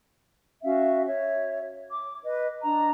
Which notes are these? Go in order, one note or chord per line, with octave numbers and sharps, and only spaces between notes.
C#4 F#4 E5 F5
C#5 E5
D6
B4 D#5
D4 D#5 A#5